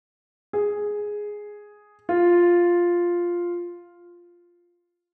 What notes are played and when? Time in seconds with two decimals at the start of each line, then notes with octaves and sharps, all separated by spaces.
0.53 G#4
2.09 F4